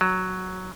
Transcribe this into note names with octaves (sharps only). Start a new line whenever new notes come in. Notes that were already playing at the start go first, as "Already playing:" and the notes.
F#3